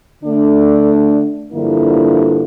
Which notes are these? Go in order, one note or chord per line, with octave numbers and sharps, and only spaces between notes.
D3 A3 D4
G2 D3 F3 A#3 E4